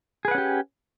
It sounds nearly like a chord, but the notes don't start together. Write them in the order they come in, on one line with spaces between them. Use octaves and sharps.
G#4 B4 F#5 C#4 G4